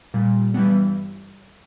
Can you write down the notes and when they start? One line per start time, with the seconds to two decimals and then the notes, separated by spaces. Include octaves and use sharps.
0.14 A#2 G3
0.54 G2 E3 G3 B3